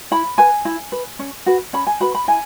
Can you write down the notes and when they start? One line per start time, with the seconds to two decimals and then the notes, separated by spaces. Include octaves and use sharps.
0.11 E4 B5
0.38 B4 G#5
0.65 E4
0.92 B4
1.19 C#4
1.46 F#4 B4
1.73 C#4 B5
1.87 G#5
2.00 F#4 B4 B5
2.15 B5
2.28 E4 G#5